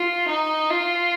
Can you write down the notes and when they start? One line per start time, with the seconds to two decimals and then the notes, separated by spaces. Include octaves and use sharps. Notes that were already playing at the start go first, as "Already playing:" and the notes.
Already playing: F4
0.28 D#4
0.71 F4